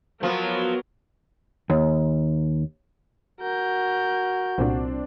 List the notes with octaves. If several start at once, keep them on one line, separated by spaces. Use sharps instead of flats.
F3 F#3 B3 A#4
D#2
F#4 A#4 G6
C2 A#2 C4 D4